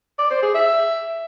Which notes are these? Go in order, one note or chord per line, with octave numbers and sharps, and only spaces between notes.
D5
C5
G#4
E5